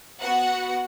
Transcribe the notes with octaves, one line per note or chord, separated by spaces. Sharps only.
B3 F#4 F#5